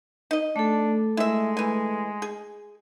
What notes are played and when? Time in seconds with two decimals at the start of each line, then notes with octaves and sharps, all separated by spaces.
0.31 D#4 D#5
0.56 A3 D4 A4
1.17 G#3 E4 E5
1.57 E3 G#5
2.22 G#4